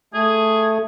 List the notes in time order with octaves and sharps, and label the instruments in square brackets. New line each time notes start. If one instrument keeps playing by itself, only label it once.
[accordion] A3 [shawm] G#4